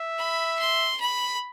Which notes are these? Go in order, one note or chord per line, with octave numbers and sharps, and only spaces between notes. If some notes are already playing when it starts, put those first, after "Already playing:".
Already playing: E5
B5
C6
B5